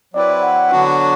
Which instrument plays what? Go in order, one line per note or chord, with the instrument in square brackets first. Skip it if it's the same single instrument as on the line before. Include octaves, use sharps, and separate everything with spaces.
[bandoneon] F#3 C4 E4 B4 [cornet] D5
[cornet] F#5
[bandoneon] D3 F#3 B3 D4 F#4